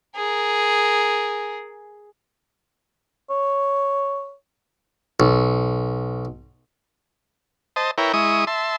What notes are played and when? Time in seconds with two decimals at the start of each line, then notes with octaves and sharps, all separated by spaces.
0.16 G#4 A#4
3.30 C#5
5.20 B1
7.76 C5 D#5 A5
7.98 E4 A#4 B4 C#5 G5
8.13 G#3 E4 D#5 C#6 D#6
8.47 E5 A5 C6